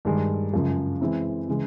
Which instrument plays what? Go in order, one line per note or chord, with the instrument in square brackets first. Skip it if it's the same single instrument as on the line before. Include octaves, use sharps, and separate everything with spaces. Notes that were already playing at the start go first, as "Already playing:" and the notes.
[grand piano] G2 D#3 G#3
F#2 C#3 F3 G#3
E3 G#3 C4 E4
C#3 E3 G#3